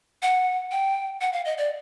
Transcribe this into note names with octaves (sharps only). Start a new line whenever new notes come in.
F#5
G5
F#5
F5
D#5
D5